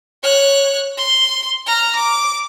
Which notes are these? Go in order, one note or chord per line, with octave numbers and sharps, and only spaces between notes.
C#5 F#6
C6
A#5 F6
D6